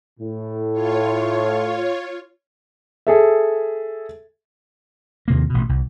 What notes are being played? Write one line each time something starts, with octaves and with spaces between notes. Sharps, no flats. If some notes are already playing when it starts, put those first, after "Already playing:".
A2
F4 C#5
G#4 A4 E5
D#2 C3 A#3
A1 B2
C2